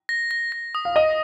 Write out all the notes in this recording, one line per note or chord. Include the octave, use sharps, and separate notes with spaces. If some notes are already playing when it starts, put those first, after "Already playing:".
A#6
A#6
A#6
D#6
F5
D#5 D#6